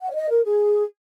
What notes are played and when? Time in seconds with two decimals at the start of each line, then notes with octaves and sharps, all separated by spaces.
0.01 F#5
0.10 C#5
0.15 D#5
0.30 A#4
0.45 G#4